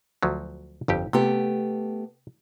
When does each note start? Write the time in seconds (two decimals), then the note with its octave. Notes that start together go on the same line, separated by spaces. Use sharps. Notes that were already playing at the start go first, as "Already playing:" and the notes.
0.23 D2 F3 F#3
0.88 G1 F2 G4
1.13 C3 A3 B3 G4